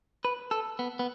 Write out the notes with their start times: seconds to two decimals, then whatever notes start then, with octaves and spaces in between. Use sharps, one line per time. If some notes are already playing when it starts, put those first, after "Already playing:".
0.25 B4
0.51 A4
0.79 B3
0.99 B3